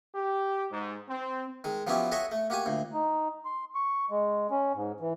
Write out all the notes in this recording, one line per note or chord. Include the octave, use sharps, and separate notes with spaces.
G4
G#2
C4
D#3 G#3
F3 F#3 B3 C#4 E4 G4
A4 C#5 D#5 E5 F#5 G#5
A3
A#3 F#4 G4 G#5
D2 A#2
D#4
C6
C#6
G#3
C#4
G#2
E3